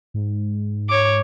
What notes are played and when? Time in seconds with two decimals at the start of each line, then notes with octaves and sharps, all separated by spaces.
0.14 G#2
0.89 C#5 D6